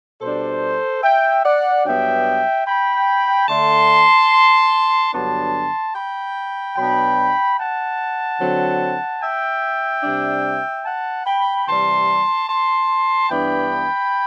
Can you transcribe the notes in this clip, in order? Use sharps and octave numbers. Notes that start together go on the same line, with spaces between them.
B2 G3 D4 A4 C5
E5 G5
D5 F#5
G2 F#3 B3 D4 E5 G5
G5 B5
D3 A3 D4 A5 C6
G2 D3 F#3 B3 D4 A5 C6
G5 B5
B2 F#3 B3 D4 G5 B5
F#5 A5
D3 F#3 C4
E5 G5
C3 G3 D4
F#5 A5
G5 B5
C3 E3 G3 A5 C6
A5 C6
G2 E3 B3 D4 G5 B5